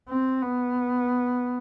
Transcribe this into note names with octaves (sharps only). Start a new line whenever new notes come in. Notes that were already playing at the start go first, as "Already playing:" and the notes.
C4
B3